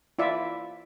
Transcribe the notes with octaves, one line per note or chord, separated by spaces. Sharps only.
E4 F4 D5 E5